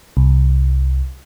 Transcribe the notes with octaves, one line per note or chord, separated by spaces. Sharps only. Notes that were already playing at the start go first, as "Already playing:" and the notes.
C2